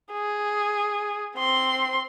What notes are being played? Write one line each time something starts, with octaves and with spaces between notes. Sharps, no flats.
G#4
C4 C6